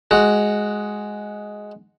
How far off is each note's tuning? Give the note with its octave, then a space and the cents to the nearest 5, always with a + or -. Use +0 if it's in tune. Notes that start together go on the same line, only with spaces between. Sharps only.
G#3 +5 F#4 +0